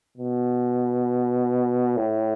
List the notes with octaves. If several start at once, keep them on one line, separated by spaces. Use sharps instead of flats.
B2
A2